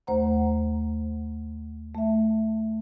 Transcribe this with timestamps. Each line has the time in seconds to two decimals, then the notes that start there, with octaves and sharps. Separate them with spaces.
0.07 D#2 A3 C5 F#5 A#5
1.95 A3 E5